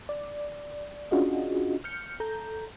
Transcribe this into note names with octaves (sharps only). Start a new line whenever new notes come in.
D5
C#4 D4 F4 F#4 G#4 D#5
F6 G6 C#7
A4 A#5 G6